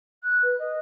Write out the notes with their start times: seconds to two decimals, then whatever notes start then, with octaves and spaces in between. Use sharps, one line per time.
0.23 F#6
0.42 B4
0.58 D#5